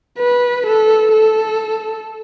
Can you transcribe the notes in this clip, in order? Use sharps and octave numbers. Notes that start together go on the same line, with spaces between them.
B4
A4
A4